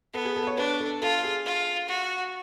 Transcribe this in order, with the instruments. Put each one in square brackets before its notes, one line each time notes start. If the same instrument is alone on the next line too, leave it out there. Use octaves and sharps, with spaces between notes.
[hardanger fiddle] B3 [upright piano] A4
[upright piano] G#4
A4
C#5
[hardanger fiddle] D4 [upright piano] B4
[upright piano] A4
[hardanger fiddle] F4 [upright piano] A4
[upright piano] G#4
[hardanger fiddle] F4
F#4